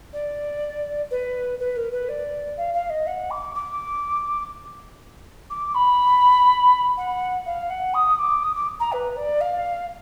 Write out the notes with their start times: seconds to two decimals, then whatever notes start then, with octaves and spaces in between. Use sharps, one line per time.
0.12 D5
1.10 B4
1.59 B4
1.75 A#4
1.91 B4
2.08 D5
2.57 F5
2.73 F5
2.89 D#5
3.06 F#5
3.30 D6
3.54 D6
5.50 D6
5.74 B5
6.97 F#5
7.45 F5
7.69 F#5
7.94 D#6
8.18 D6
8.43 D#6
8.55 D6
8.79 A#5
8.92 B4
9.16 D5
9.40 F5